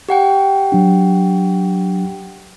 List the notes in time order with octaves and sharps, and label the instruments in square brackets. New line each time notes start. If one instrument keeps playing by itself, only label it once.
[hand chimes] G4 F#5 G5
[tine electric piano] F#3 D4